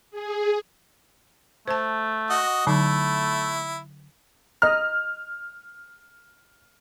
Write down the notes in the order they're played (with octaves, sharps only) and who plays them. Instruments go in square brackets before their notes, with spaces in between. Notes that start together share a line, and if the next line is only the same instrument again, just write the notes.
[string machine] G#4
[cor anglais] A3 [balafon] C5 A5
[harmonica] F#4 D#5
[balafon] D3 F#3 D#4 [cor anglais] A3 [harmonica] E4
[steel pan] D#5 A#5 [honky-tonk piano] F6